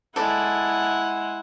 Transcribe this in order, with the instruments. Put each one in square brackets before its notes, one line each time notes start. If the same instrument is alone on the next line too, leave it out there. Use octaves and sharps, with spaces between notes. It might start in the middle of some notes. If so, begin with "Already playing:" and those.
[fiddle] G#3 [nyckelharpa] E4 F#5 [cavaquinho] A4 D5